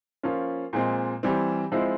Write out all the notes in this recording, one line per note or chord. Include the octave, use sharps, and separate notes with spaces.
F3 A#3 C#4 F4
A#2 F3 G#3 C4
E3 G3 C4
F3 G#3 C4 E4